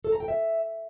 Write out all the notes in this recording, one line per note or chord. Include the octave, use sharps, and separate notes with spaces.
A4
A#5
G5
E5